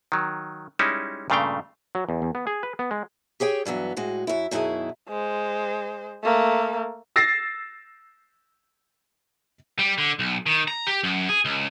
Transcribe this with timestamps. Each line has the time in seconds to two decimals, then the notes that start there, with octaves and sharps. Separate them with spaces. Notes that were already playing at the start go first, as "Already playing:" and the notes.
0.12 D#3 F#3
0.79 G3 G#3 C#4 D#4 E4
1.30 G2 A#2 C#3 A3 F5 G5
1.95 F#3
2.09 E2
2.22 E2
2.35 B3
2.47 G#4
2.63 B4
2.79 B3
2.91 G#3
3.40 G4 G#4 C#5 G5
3.65 G2 E3 F#3 B3
3.97 A2 G#3 F#4
4.27 F#2 E4
4.51 F#2 B2 D#3 E4 G#4 A5
5.09 G#3 C5
6.24 A3 A#3
7.16 E6 A6 A#6 C7
9.79 G3
9.98 D3
10.19 B1
10.46 D#3
10.68 A#5
10.87 G4
11.03 F#2
11.29 G#4
11.45 C#2